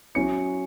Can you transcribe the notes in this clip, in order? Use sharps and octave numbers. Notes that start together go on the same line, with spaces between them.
F#3 C#4 E4 C#7